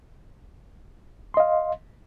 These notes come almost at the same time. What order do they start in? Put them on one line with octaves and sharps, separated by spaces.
C6 D#5 F5